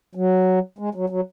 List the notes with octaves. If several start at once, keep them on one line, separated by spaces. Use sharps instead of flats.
F#3
G#3
F#3
F#3